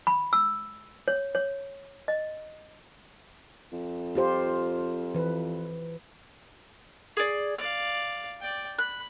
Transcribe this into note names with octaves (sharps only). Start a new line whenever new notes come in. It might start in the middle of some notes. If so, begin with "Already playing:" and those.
B5
E6
C#5
C#5
D#5
F2
F4 G4 C5
E3 B4
G#4 D5
D5 F5 F6
D5 G5
B5 F#6